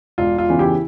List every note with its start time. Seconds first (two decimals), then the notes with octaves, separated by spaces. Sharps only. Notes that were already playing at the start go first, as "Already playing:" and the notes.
0.18 E1 F4
0.38 F4
0.49 E2 C#3 E3
0.59 E4 G4